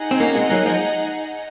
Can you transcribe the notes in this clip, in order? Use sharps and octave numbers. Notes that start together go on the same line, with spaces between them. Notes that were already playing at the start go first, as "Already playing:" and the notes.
Already playing: D#4 G#4 D#5 F#5
C4
A#3 C#4
G#3 C4
F#3 A#3
F3 G#3